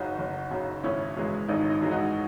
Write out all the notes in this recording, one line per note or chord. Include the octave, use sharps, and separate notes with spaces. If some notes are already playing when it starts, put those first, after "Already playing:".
Already playing: F#1 F#2 C#3 D#4 F#4
F#1
F#2 C#3
G#1 C#4 E4
F#2 E3 G#3
G#1 D#4
D#4
F#2 E3 G#3
D#4 F#4